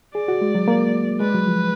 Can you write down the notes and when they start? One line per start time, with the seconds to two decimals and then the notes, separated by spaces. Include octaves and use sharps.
0.15 G#4 D5
0.28 F#4
0.42 G#3
0.55 F#3
0.68 A#3
1.20 G#3 B4
1.34 F#3
1.47 F3